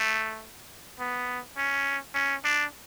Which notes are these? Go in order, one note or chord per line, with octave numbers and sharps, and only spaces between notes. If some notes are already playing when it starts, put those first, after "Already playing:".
Already playing: A3
B3
C#4
C#4
D4